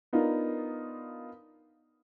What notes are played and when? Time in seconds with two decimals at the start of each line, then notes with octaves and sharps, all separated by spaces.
0.13 B3 D4 D#4 F4 A#4